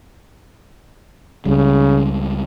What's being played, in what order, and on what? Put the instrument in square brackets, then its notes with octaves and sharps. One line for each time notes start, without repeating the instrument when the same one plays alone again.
[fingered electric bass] C#2 G3 [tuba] C#3